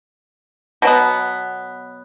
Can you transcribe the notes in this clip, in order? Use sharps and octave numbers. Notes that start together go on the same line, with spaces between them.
B2 F#3 B3